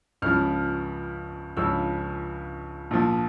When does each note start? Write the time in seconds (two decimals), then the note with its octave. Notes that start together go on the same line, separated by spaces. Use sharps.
0.22 C#2 C#3 F3 F6
1.57 C#2 C#3 F3 E6
2.91 A#1 A#2 F3